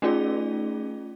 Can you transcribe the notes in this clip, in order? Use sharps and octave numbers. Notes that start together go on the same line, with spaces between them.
A3 C#4 D#4 F4 G#4 D5